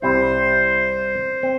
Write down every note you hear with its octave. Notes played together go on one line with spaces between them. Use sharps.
C2 C3 G3 C4 E4 C5
C4